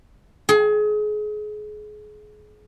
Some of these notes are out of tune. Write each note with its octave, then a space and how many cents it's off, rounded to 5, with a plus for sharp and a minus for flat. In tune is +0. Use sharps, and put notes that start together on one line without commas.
G#4 +30